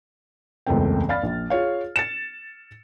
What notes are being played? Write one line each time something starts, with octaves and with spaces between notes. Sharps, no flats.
E1 C#2 F#2 A3 C4 G5
D5 F5 B5 F6 A6
A#1
F4 G#4 C#5 F5
A6 C#7 E7